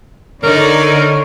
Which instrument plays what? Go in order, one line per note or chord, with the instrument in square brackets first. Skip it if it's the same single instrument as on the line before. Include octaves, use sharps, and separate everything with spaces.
[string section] D3 [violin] D#4 D5 [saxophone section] A#4 [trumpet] C#5